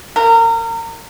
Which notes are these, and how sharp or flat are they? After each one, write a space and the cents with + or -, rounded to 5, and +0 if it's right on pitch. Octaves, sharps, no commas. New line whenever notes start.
A#4 -30